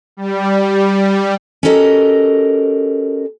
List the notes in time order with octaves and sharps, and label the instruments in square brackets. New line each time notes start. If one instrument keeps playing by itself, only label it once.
[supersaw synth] G3
[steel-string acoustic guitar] C#4 F#4 G4 A4 A#4 D#5